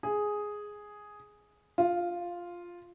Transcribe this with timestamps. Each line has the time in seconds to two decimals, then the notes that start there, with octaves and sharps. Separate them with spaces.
0.03 G#4
1.78 F4